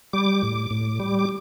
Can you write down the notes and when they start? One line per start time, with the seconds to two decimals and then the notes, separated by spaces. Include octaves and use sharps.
0.13 G3 D6
0.43 A2
0.71 A2
1.00 G3
1.19 D6